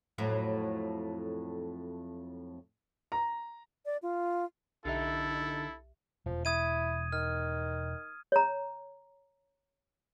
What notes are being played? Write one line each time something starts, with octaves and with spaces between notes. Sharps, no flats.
F2 A2 F#3
A#5
D5
F4
B1 D3 D#4 E4 G4 A4 E5
E1 F3
E4 D#6 G#6 D#7
D#3 F6
C#5 A#5